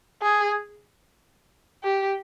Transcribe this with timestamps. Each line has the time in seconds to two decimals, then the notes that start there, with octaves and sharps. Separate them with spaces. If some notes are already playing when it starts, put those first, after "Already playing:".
0.22 G#4
1.84 G4